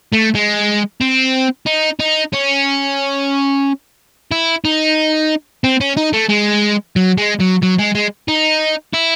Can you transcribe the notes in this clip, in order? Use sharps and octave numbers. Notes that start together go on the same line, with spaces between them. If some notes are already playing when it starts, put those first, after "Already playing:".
A3
G#3
C4
D#4
D#4
C#4
E4
D#4
C4
C#4
D#4
A3
G#3
F#3
G#3
F#3
F#3
G#3
G#3
D#4
E4